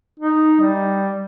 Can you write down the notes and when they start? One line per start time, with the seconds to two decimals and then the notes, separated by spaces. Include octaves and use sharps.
0.20 D#4
0.60 G3